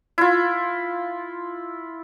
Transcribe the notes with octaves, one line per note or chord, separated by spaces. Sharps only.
E4 F4